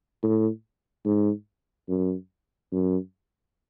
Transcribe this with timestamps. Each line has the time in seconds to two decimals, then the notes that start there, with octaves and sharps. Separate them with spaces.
0.23 A2
1.05 G#2
1.89 F#2
2.72 F#2